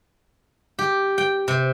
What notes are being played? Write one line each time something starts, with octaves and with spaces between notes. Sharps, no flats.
G4
G5
C3